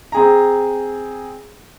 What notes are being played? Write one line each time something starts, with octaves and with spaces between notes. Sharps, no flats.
C4 G#4 A#5